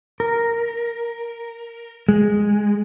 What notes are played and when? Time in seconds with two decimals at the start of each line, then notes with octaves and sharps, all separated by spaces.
0.20 A#4
2.08 G#3